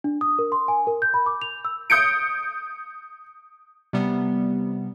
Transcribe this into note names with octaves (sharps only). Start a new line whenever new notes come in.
D4
D#6
A#4
C6
G#5
A#4
G6
B5
D6
F7
E6
D#6 G6 C#7 D7
C3 G3 B3